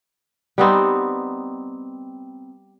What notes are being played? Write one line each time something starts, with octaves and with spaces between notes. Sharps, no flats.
G3 B3 C4 D#4